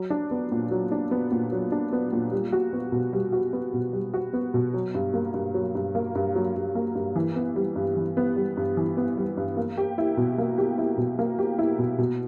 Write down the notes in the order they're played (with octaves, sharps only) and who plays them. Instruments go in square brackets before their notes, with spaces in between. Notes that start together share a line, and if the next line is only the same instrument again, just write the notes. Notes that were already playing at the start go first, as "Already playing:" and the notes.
Already playing: [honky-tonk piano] F#3
D4
B3
A#2
F#3
D4
B3
A#2
F#3
D4
B3
A#2
G3
F#4
B3
B2
G3
F#4
B3
B2
G3
F#4
B3
B2
F#3
G2
A#3
G2
F#3
G2
A#3
G2
F#3
G2
A#3
G2
E3
B3
G3
G2
E3
B3
G3
G2
E3
B3
G3
G2
A#3
G4
E4
B2
A#3
G4
E4
B2
A#3
G4
E4
B2
B2